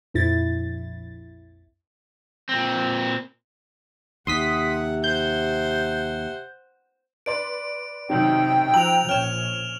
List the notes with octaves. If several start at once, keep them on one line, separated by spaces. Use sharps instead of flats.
A#1 F2 E4 A6
A#2 C4
D#2 C3 F#5 C6 D#6 B6
C5 F#5 G6
B4 D5 C6 D7
F#2 C3 D#3 F#3 D#4 G5
F3 A#5 E6 F#6 F7 F#7
A#1 C#4 C#5 F6 E7